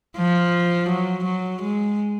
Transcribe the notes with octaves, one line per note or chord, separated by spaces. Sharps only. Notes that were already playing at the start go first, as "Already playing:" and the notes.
F3
F#3
F#3
G#3